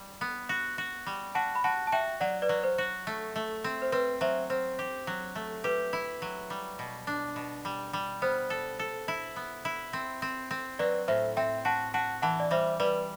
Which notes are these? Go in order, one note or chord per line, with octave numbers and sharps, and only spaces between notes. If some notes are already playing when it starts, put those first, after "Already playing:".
Already playing: G3
B3
F#4
F#4
G3
F#4 F#5 A5
B5
F#4 F#5 A5
A5
F#4 E5 G5
F#3 D5 F#5
B4 D5
F#3
C5
F#4
A3
A3
C4
C5
C4 B4
F#3 C5 E5
C4 C5
G4
F#3
A3
G4 B4
E4
F#3
G3
B2
D4
B2
G3
G3
B3 C5
A4
A4
E4
B3
E4
C4
C4
C4
F#3 B4 D5
A2 C5 E5
C4 E5 G5
F#4 F#5 A5
F#4 F#5 A5
E3 F#5 A5
D5
G3 C5 E5
G3 B4 D5